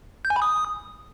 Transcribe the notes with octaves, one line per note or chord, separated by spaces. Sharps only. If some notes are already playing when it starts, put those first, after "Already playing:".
G6
G#5
B5
D#6